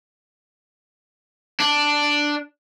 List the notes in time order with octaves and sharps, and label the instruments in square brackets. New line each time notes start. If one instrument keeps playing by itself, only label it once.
[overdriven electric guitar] D4